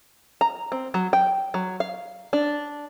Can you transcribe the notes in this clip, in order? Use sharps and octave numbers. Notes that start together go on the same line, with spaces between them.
A#5
C4
F#3
G5
F#3
F5
D4